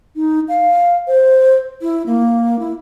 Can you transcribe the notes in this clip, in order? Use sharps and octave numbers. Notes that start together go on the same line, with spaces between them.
D#4
F5
C5
E4
A#3
E4